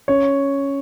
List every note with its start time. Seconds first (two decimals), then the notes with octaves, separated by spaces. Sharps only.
0.08 C#4 C#5